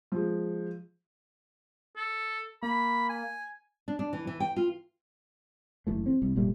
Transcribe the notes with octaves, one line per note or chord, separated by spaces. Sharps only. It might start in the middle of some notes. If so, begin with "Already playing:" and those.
F3 G#3
A4
A#3 B5
G#5
D4
D4
E3
E3
G5
F4
F#1 E3 A3
C4
C2
F1 A#2 G3 A3